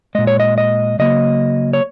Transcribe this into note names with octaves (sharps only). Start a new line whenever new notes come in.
A#2 G#3 D#5
C#5
D#5
D#5
C#3 F#3 A#3 D#5
C#5